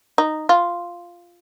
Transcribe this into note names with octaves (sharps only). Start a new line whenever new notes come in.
D#4
F4